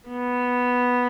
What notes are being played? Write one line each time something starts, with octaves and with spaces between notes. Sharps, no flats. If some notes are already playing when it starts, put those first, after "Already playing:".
B3